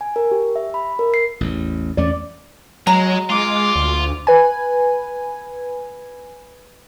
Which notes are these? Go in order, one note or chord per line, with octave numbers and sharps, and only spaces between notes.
G#5
A#4
G4
E5
B5
A#4
C7
A1 E2
E2 A3 C#4 D5
F#3 G#3 A#5
G#3 F4 D6
D2
B4 G#5